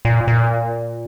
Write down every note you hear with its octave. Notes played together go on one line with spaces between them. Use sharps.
A#2
A#2